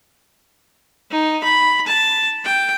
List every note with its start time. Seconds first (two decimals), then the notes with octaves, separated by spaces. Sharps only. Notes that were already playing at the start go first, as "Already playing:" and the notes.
1.11 D#4
1.44 B5
1.87 A5
2.45 G5